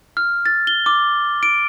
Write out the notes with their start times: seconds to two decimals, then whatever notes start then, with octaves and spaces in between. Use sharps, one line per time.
0.17 F6
0.46 A6
0.67 G7
0.86 D6
1.43 D7